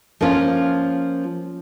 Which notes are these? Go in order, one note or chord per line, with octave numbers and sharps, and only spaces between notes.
F3 A#3 C#4 F4